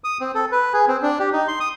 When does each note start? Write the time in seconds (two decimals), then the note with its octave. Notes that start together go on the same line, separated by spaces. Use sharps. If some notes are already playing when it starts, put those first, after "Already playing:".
0.04 D#6
0.21 C4
0.35 A4
0.52 B4
0.73 G#4
0.88 C4
1.02 D4
1.19 G4
1.33 D#4
1.48 C6
1.60 D#6